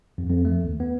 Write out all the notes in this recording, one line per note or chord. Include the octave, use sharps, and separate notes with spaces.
F2
F2
A3
D#2
B3